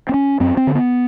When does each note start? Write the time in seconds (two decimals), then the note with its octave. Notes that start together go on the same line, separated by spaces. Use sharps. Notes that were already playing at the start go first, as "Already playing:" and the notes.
0.09 C4
0.14 C#4
0.40 F#2 C4
0.57 C4
0.67 D3
0.75 B3